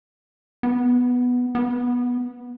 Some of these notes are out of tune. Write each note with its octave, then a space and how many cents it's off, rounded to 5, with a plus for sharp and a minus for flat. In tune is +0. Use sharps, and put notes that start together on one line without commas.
B3 +0
B3 -10